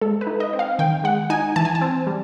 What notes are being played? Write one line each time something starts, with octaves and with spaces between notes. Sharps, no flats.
G#3 A4
B4
D#4
D#5
C4
F5
D#3 G5
G#3 F#5
D#4 G#5
E3 A5
G#5
A5
C4
G3